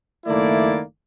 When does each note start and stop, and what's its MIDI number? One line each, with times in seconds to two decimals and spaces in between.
0.27 0.81 30
0.27 0.81 51
0.27 0.81 57
0.27 0.81 58
0.27 0.81 64
0.27 0.81 74